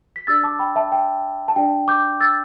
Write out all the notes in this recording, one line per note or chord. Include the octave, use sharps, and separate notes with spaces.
B6
D4 G4 D5 E6 A6
A5 D6
G5 B5
E5 A5
G5
A5
D4 G4 D5 G5
D6 G6
E6 A6